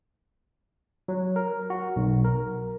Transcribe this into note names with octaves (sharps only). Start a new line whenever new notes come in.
F#3
A#4
F#4
B1
A#4